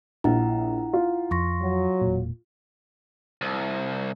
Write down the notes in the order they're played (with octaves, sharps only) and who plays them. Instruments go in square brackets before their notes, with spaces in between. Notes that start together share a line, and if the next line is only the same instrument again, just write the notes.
[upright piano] A#1 [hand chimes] E4 F#5 A#5
[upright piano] F4
[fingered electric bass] F2 [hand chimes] C6 C#6 A#6
[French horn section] F#3
[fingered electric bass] E1 A#2
[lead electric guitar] C2